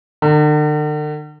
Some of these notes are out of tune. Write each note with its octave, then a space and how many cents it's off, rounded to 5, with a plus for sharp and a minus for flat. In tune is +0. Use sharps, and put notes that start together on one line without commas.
D3 +45 A#5 -35